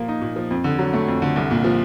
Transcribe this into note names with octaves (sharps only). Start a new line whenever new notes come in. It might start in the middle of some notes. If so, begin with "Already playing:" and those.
Already playing: A#2 F3 A#3
D#4
A#2
F3
F2
D3
F#3
A3
F2
D3
C2
A#2
F3